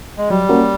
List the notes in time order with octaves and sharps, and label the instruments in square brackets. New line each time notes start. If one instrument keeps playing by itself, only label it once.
[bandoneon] G#3
[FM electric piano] F#3 [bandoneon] G3
[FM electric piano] A#3 C#4 F#4 A#4